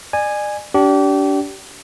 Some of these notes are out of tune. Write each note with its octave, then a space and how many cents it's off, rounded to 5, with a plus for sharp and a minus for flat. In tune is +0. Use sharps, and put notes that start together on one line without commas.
D5 +40 G#5 -5
D4 -30 G4 -30